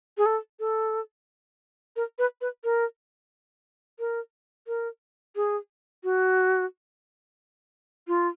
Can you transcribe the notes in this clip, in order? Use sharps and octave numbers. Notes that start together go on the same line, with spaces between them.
G#4
A4
A4
A#4
B4
B4
A#4
A#4
A#4
G#4
F#4
F4